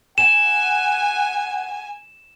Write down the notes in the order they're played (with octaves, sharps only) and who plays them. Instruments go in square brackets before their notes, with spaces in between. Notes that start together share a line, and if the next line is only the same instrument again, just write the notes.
[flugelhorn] F#5 [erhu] G#5 [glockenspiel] E7